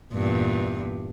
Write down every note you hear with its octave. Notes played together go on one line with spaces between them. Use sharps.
E2 G2 A#2